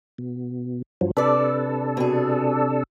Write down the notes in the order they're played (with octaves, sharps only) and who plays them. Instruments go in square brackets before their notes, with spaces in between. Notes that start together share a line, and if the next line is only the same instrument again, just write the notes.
[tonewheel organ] B2
G2 F3 F#3
[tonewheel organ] C3 D4 A4 [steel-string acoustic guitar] B4 D5
[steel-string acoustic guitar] B2 G#4